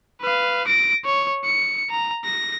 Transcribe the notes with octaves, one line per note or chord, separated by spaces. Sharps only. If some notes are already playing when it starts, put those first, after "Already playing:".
B4 F5
A#6 D7
C#5
C#7
A#5
A#6